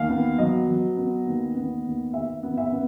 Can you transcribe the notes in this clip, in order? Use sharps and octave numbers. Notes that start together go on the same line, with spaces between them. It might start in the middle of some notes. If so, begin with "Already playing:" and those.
Already playing: D#2 F5
B3
F#3 D#5
F#3
B3
D#2
B3
D#2
D#2 E5
B3
E5
B3